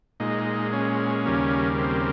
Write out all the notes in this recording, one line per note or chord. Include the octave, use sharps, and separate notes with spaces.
A#2 G#3 D#4
C#4
D#2 C#3 G3 A#3
C4